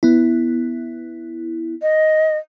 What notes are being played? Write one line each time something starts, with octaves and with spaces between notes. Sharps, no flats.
B3 E4
D#5